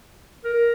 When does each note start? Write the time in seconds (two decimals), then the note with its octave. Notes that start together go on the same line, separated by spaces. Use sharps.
0.44 A#4